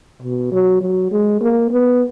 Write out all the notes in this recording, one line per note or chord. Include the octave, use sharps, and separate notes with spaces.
B2
F#3
F#3
G#3
A#3
B3